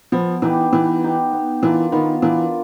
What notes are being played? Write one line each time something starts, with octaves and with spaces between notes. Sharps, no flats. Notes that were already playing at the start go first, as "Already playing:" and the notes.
F3 B3
E3 D#4 G4 B4
E3 B3
D#4 G4 B4
B3
E3 D4 F4 A#4
D#3 B3
E3 D4 F4 A#4